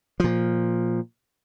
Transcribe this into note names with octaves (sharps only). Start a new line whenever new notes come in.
A#2 F3